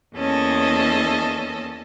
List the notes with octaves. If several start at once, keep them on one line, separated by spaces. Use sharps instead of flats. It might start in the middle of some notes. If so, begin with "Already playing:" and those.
E2 A#3 C#4 A4 D#5